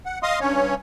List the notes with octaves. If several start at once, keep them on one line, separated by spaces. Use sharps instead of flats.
F#5
D#5 F5 C6 D#6
G2 C#4 C#5